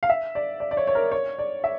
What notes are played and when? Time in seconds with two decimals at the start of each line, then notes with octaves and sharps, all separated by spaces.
0.03 F5
0.09 E5
0.35 D5
0.60 D5
0.71 D5
0.77 C#5
0.87 C#5
0.95 A#4
1.12 C#5
1.39 D5
1.64 E5